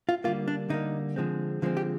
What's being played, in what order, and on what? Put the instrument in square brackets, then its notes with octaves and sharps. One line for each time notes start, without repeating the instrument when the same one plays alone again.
[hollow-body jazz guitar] F4
D3 G3 A#3 F4
D4
D3 G3 A#3 D#4
D3 F3 G#3 C4
D3 F3 G#3 C4
G4